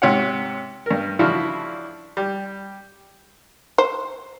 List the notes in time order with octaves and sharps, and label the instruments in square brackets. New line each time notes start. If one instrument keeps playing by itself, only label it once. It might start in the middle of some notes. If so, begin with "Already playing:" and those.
[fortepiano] G#2 C3 C#5 F#5
G2 A#4
C#3 E3 F3 D4 E4 F#4
G3
[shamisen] C5